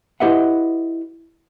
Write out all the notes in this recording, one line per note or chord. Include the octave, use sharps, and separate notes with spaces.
E4 G4 B4 D#5 E5 F#5